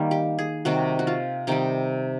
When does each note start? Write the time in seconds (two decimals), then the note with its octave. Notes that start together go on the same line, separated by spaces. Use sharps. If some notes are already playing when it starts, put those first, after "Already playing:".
Already playing: D#3 G3 A#3
0.11 G4
0.39 G#4
0.65 C3 D#3 G3 F#4
0.99 F#4
1.07 F4
1.47 C3 D#3 G3 D#4